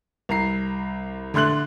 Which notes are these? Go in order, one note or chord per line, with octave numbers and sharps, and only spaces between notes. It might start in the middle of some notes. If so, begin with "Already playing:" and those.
C2 A#5 C7
D3 A3 C6 F#6 F#7